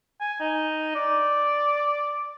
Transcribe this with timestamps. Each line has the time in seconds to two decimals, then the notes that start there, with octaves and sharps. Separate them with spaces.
0.21 G#5
0.40 D#4
0.95 D5